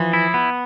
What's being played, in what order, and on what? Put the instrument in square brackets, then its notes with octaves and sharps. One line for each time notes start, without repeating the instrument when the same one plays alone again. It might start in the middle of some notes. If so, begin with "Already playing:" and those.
Already playing: [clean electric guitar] E3 [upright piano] F3
[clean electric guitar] E4
B3